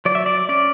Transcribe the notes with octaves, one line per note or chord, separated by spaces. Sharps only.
F#3 D5
E5
D5
C#4 D5